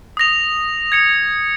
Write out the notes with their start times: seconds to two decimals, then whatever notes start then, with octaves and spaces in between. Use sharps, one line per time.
0.17 D#6 A#6 F7
0.92 G#6 C#7 F7